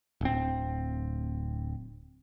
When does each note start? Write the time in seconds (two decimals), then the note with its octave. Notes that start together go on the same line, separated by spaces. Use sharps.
0.21 D1 C4